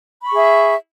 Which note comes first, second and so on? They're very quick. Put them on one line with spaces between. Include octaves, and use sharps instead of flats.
B5 C#6 G#4 E5